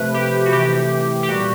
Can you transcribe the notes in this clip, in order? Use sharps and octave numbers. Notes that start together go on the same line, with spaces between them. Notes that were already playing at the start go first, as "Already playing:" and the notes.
Already playing: C3 F3 A3 B4
G4
F#4
C3 E3 A3 G4
G4
A#2 G3 F#4